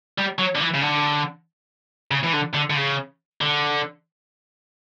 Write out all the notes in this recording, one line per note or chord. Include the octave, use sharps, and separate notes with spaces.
G3
F#3
D3
E3
C#3
D3
C#3
E3
D3
D3
D3
C#3
D3